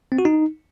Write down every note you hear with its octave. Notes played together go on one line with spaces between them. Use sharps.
C4
F#4
D#4